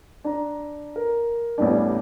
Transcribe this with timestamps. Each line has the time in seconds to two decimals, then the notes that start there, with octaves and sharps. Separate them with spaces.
0.24 D4 A#5
0.96 A#4
1.58 A1 E2 G3 D4